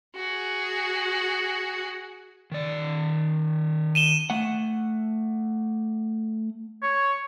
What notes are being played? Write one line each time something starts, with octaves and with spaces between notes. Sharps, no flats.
F#4 G#4
D#3 D5
D#7 E7 G7
A3 F#5
C#5